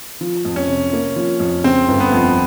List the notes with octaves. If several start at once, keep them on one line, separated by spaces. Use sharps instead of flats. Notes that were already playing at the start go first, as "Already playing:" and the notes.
F3
F2
C#4
C3
A#3
F3
F2
C#3 C4
G1
B3
F2